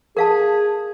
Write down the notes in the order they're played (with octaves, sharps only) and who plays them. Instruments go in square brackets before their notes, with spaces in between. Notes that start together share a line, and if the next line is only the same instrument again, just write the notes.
[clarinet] G#4 [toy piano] A#4 F5 A5